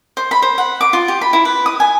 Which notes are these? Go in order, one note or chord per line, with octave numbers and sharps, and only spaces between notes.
C5
B5
C5
F#5
D6
F4
G4
B5
E4
B4
D#6
G#5